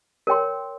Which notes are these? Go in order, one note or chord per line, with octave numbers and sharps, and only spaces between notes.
A#4 C#5 G5 C6